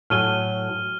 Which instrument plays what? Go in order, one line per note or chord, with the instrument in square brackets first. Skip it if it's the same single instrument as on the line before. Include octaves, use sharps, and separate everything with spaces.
[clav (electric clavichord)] A2 F#3 G#5 [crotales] F6 D#7 G7